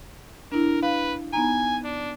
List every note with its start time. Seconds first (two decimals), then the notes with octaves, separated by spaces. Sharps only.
0.52 D4 E4 A#4
0.83 B4 F5
1.33 B3 D#4 G#5 A#5
1.84 D4